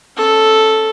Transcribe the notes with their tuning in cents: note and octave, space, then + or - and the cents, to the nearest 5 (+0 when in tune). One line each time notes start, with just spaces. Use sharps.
C#4 -20 A4 +0